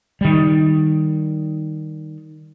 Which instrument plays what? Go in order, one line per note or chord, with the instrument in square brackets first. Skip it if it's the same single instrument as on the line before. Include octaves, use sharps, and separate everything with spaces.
[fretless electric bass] D#3 G3